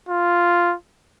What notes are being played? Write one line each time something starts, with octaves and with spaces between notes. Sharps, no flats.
F4